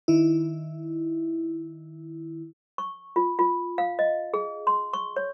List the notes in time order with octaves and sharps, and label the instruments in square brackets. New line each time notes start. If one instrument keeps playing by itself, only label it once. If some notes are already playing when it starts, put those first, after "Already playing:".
[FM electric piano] D#3 E4
[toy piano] C#6
F4
F4
F5
D#5
G#4
C6
C#6
C#5